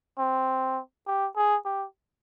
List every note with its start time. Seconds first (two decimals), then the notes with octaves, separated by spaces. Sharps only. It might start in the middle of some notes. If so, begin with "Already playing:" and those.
0.19 C4
1.07 G4
1.36 G#4
1.65 G4